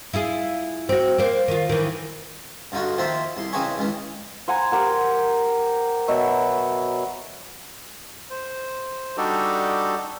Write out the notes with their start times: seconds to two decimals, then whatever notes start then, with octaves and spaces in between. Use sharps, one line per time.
0.13 E4 F4 G#4
0.89 C4 F#4
1.18 A#3 C5
1.48 D#3 F4
1.69 D#3 E3
2.72 G2 D3 D#4 F4 F#4
2.98 D#3 F3 A#3 F4 C5 E5
3.37 C2 C6
3.52 C#3 E3 C4 D#4 G#4 C#6
3.78 C#2 D#3 E3
4.48 C5 F#5 G#5 A#5
4.72 G4 A#4 F#5
6.08 B2 F#3 C#5 E5
8.30 C5
9.17 G3 D4 D#4 F#4 G4 A4